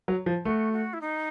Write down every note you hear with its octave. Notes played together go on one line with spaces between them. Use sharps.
F#3
F3
A3 F#4
F#4
E4
D#4